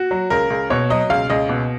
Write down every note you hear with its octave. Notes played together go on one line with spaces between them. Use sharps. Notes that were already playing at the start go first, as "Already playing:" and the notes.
Already playing: F#4
F#3
C#2 A#4
C#2
B2 C#5
F#3 D#5
C#2 F5
C#2 D#5
B2